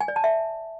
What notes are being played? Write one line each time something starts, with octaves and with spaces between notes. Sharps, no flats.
G#5
D5
A5
E5